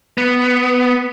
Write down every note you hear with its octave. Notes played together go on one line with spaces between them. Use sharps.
B3